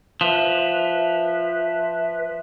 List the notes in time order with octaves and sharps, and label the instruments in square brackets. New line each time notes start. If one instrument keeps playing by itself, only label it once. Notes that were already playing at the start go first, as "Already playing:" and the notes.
[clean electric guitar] F3 [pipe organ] B4 E5